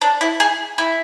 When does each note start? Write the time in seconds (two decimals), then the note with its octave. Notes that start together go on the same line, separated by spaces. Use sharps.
0.02 D4
0.21 E4
0.40 G#4
0.78 E4